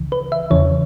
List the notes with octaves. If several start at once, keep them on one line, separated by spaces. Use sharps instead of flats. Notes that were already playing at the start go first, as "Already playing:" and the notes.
Already playing: C#2 C#3 E3
B4
E5
E2 C#3 E3 C#5